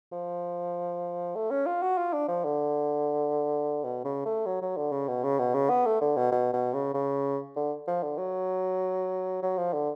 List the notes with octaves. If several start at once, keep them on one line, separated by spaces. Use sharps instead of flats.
F3
A3
C#4
F4
F#4
F4
D4
F3
D3
B2
C#3
A3
F#3
F#3
D3
C#3
B2
C#3
B2
C#3
B3
A3
D3
B2
B2
B2
C#3
C#3
D3
F3
D3
F#3
F#3
F3
D3